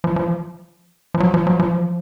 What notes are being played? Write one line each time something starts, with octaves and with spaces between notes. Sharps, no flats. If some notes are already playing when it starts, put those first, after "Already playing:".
F3
F3
F3
F#3
F3
F#3
F3